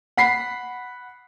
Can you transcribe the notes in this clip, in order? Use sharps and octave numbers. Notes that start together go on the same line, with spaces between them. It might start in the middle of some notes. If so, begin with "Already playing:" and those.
F#5 B5 B6 C7